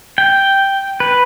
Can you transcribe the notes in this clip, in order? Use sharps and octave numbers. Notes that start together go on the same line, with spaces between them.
G5
B4